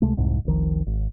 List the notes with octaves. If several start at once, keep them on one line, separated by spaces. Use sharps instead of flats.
C#2 C3 G#3 A3
C2 F2 G#2 C3
F1 C2 D#3 F3
G#1